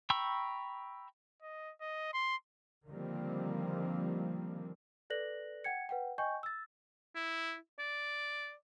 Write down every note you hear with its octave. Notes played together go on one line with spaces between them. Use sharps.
G5 A#5 B5 C#6 E6
D#5
D#5
C6
D3 D#3 F3 G3 A#3 C4
A4 B4 D5 F#6 A#6 F#7
F#5 G5 G#6 C#7
B4 F#5 G5
D#5 G5 G#5 C#6 G6
E6 A6
E4
D5